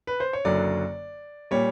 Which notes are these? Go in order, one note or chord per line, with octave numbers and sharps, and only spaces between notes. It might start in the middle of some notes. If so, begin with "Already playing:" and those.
B4
C5
C#5
F#1 F#2 D3 F#3 D5
A#2 G3 C#5